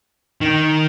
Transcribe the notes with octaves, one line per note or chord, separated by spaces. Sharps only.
D#3